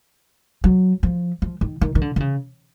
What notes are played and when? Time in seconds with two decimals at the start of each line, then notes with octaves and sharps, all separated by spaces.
0.64 F#3
1.03 F3
1.42 F3
1.61 D#3
1.81 D#3
1.95 D#3
2.01 D3
2.16 D3
2.20 C#3